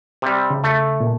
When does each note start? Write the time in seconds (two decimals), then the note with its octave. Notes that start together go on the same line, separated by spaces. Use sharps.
0.22 C3 G3
0.50 C#3
0.64 A3
1.00 A#2 A#3